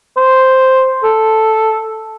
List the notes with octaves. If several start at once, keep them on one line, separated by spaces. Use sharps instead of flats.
C5
A4